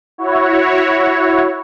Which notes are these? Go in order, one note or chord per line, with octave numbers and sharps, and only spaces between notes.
E4 F#4 C#5